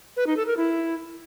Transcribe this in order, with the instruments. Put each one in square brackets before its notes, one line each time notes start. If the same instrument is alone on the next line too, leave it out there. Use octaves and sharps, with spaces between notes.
[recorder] B4
D#4
A4
A#4
E4